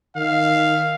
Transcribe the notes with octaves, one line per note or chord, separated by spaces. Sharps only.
D#3 F5